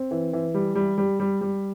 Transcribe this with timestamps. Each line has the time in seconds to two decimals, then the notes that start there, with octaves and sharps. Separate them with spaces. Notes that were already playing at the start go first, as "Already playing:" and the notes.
Already playing: C4
0.11 E3
0.33 E3
0.54 G3
0.76 G3
0.98 G3
1.20 G3
1.41 G3